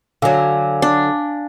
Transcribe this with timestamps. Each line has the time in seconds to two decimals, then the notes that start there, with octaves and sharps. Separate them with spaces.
0.22 D3 F#3 F5 G#5
0.82 D4